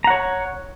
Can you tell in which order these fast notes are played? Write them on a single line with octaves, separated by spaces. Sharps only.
A#5 F#5 C#5